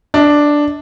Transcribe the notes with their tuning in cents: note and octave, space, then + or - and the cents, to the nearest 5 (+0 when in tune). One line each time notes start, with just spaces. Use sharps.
D4 +0 D#5 +30